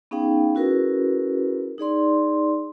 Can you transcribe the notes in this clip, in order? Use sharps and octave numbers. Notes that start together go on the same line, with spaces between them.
B3 C#4 D#4 G#4 F5 G5
C#4 E4 F#4 G#4 A#4 B4
D#4 G#4 D5 C6